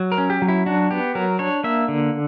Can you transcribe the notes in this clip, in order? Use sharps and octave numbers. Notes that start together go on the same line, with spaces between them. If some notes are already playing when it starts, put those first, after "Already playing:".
Already playing: F#3
A#4
C#4
G4
F#3
E4
D4 F#4
B3 G4
F#3 A#4
D4 C#5
A#3 E5
D3